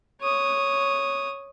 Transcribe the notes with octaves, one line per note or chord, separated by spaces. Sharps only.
C#5 D#6